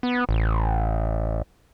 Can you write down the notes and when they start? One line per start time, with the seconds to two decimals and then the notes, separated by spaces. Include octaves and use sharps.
0.03 B3
0.29 A1